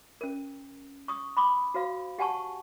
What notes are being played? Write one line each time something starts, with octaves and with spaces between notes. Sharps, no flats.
C#4 A#4
C#6 D#6
B5 D6 D#6
F#4 C5 F5
G4 F#5 G#5 A5 C#6